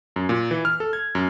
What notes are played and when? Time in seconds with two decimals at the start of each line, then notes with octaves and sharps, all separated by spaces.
0.16 F#2
0.29 A#2
0.51 E3
0.65 F6
0.80 A4
0.93 G#6
1.15 F#2